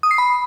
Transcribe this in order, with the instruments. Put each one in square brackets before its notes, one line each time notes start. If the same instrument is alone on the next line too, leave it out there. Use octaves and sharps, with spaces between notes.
[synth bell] D#6
C7
B5